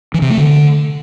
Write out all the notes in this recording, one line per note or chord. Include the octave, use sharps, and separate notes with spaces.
E3
C3
A3
D3